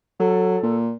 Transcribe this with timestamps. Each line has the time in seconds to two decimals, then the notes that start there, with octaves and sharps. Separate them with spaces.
0.20 F#3 A4
0.63 A#2